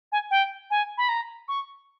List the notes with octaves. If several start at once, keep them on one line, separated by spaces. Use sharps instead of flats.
G#5
G5
G#5
B5
A#5
C#6